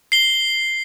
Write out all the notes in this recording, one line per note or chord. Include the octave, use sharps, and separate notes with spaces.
C7 G7